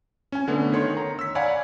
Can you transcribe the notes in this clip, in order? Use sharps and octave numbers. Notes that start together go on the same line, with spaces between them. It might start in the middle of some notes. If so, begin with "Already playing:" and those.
C#4 G#5
D3 A3 B3
D#3 C#5 C6
A#5
E6 B6
C#5 D5 F5 F#5 G#5 B5